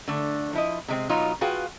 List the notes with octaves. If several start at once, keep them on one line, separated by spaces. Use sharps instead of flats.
D3 A3
F3 E4 D#5
C3 G#3 C4
B2 F#3 D#4 F4
F4 F#4 G#4 B4 F5 G5